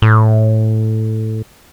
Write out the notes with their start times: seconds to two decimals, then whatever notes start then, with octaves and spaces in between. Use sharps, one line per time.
0.02 A2